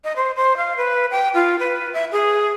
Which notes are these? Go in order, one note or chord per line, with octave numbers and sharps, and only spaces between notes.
D#5
C5
C5
F5
B4
G5
F4
B4
E5
G#4